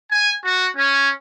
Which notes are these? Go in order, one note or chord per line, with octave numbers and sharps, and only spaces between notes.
G#5
F#4
C#4